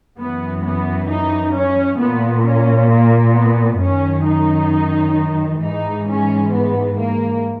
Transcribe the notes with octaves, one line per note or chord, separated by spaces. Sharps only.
F#2 E3 B3
B3
D#4
C#4
A#2 B3
C#4
A#3
B3
F#2 D#3 C#4
D#4
G#2 E3 D#4
C#4
B3
A#3